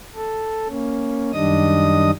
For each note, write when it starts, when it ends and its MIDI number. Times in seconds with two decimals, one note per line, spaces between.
0.15 0.68 69
0.69 1.32 58
0.69 1.32 61
1.33 2.11 42
1.33 2.11 51
1.33 2.11 55
1.33 2.11 62
1.33 2.11 75
1.33 2.11 87